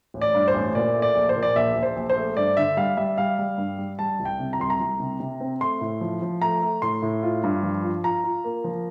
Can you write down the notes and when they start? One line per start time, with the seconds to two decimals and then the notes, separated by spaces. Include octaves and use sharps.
0.14 A1
0.21 D5
0.34 G2
0.48 C5
0.54 A1
0.75 A#2 D5
0.95 A3
1.02 D5
1.15 A#1
1.29 C5
1.36 A#2
1.43 D5
1.56 A#1 E5
1.76 A#1
1.83 C5
1.96 A#1
2.10 C5
2.17 A3
2.37 G2 D5
2.57 D3 E5
2.77 G3 F5
2.97 G3 E5
3.18 G3 F5
3.39 G3
3.58 G2
3.78 G3
3.99 G3 A5
4.19 C2
4.25 G5
4.39 C3
4.53 A#5
4.59 C2 C6
4.70 A#5
4.80 C2
5.00 C3
5.20 C3
5.40 C4
5.61 A3 C6
5.81 A2
6.01 F3
6.22 F3
6.42 A3 A#5
6.62 A3
6.82 A2 C6
7.02 A2
7.23 F4
7.44 G2
7.63 F3
7.84 F4
8.04 F4 A#5
8.24 F4
8.44 A#3
8.64 F3